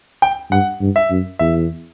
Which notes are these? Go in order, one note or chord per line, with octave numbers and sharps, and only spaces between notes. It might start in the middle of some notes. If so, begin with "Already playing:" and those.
G5
G2 F#5
G2
E5
F#2
E2 E5